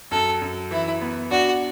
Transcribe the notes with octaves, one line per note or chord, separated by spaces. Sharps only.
F#2 A4
F#2
E3 E4
B3
D4 F#4